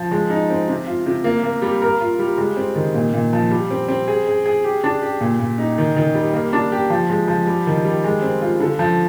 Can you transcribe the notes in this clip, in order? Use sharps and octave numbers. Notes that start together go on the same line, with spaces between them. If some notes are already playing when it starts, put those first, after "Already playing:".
Already playing: F3
G#3
D#4
C4
C3
F4
C3
A#3
A#3
G3
A#4
F4
G3
G#3
C4
D#3
A#2
A#2
F3
G3
C4
C4
G#4
G#4
G#4
G4
D4
G4
A#2
A#2
D#4
D#3
D#3
G3
A#3
D4
G4
F3
G#3
F3
G3
D#3
G3
G#3
C4
F4
D3
F3